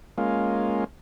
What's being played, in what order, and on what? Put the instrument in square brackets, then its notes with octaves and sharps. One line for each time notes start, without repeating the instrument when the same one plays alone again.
[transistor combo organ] G#3 A#3 C#4 F4